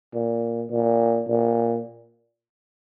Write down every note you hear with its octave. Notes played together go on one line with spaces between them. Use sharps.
A#2
A#2
A#2